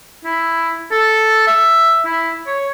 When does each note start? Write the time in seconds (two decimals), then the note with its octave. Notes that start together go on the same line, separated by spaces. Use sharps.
0.25 E4
0.92 A4
1.47 E5
2.05 E4
2.47 C#5